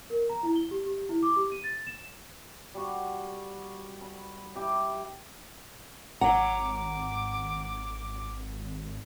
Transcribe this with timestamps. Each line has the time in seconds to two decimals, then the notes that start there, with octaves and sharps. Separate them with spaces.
0.10 A#4
0.30 A#5
0.43 E4
0.56 G7
0.71 G4
0.86 G4
1.09 E4
1.23 D6
1.36 G4
1.52 D#7
1.64 A6
1.87 E7
2.74 G3 F#4
4.01 B5
4.55 E4 G4 E5
6.21 G#1 C#5 F#5 A#5 D6